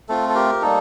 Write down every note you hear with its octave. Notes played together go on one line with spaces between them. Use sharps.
A3 C4 F4 A4
A4
G4 A#4
G3 A#3 D#4 A4